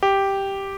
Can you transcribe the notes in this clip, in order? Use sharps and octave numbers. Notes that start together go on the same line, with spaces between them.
G4